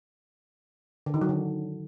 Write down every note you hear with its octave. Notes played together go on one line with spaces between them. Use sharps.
D3
D#3
F#3
D3